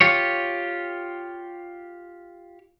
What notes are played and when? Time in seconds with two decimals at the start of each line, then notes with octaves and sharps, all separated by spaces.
0.01 F4 G4 C#5